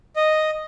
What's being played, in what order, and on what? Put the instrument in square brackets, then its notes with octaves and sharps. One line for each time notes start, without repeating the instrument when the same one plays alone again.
[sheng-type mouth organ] D#5